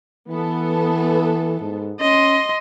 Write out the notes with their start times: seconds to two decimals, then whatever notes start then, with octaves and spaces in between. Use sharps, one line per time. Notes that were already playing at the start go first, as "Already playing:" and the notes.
0.29 E3 B3 A4
1.61 G#2
2.00 C#4 D#5 C6